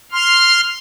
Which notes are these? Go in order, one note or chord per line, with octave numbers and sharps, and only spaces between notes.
C6 F6